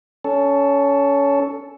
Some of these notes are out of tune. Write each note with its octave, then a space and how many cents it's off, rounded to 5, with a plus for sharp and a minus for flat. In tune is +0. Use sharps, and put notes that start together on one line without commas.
C#4 +20 A4 +0